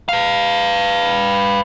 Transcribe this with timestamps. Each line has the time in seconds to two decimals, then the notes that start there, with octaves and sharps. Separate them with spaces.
0.09 B4 F5